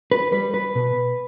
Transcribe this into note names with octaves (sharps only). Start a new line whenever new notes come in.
B4
G3 B4
B4
B2